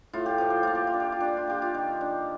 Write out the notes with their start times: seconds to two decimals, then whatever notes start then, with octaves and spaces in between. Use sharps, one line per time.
0.13 A2 F4
0.26 G4
0.38 F3 F4
0.50 G4
0.63 A#3 F4
0.75 G4
0.87 F4
0.94 D4
1.00 G4
1.12 F4
1.20 D4 G4
1.37 F4
1.47 A#3 G4
1.62 F4
1.74 D#3
2.01 D4